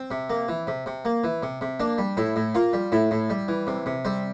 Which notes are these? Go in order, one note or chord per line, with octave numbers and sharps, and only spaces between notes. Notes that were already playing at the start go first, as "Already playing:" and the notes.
Already playing: C4
C3
A#3
E3
C3
C3
A#3
E3
C3
C3
A#3 D4
G3
A2 E4
A2
A#3 F4
G3
A2 E4
A2
G3
E3
C3
C3
G3 C4